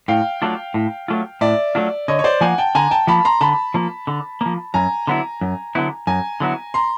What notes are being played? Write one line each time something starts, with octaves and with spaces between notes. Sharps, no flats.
A2 F5 G5
F#3 A3 D4 F4
A2
F#3 A3 D4 F4
A2 D5 E5
F#3 A3 D4 F4
D3 C#5 D#5
C#5
C5 D5
F3 A#3 F#5 G#5
G5 A5
D3 G#5 A#5
G5 A5
F3 A#3 A5 B5
A#5 C6
D3 A5 B5
F3 A#3
D3
F3 A#3
F#2 G#5 A#5
D3 F#3 B3 E4
F#2
D3 F#3 B3 E4
F#2 G#5 A#5
D3 F#3 B3 E4
A#5 C6